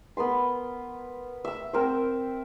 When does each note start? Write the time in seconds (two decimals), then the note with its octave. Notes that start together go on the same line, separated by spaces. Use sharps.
0.17 B3 A#4 B4 C6
1.45 E5 E6
1.73 C4 A#4 C5